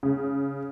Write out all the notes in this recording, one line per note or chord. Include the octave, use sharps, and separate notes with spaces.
C#3